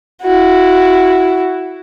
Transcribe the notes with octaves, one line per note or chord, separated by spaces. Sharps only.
E4 F#4